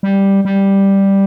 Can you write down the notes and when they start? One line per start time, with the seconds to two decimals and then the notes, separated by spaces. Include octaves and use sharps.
0.03 G3
0.45 G3